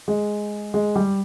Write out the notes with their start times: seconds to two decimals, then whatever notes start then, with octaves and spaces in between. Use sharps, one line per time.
0.08 G#3
0.74 G#3
0.95 G3